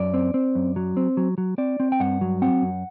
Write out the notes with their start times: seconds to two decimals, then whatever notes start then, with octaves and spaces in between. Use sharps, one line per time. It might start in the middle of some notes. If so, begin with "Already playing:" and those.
Already playing: F#2 D5
0.14 C4
0.34 C4
0.55 F#2
0.76 F#3
0.97 C4
1.17 F#3
1.38 F#3
1.58 C4 D5
1.80 C4
1.92 G5
2.00 G2 F#5
2.21 F#3
2.42 C4 F#5
2.62 F#2